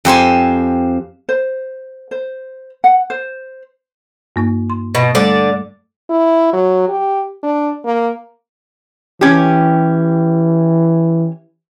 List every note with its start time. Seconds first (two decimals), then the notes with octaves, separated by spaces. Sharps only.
0.05 F2 G4 C5 G#5
1.29 C5
2.11 C5
2.84 F#5
3.10 C5
4.36 G2 A#3 D#4
4.70 C6
4.95 B2
5.15 D3 G3 A3 A4 D5
6.10 E4
6.53 F#3
6.88 G4
7.43 D4
7.85 A#3
9.21 E3 C#4 G4